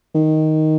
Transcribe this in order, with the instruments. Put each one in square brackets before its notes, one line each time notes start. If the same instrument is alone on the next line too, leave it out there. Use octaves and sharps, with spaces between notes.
[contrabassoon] D#3